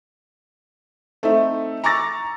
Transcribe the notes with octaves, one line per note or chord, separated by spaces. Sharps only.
A3 C4 D#4 E5
A#5 C#6 D6 E6 A6 A#6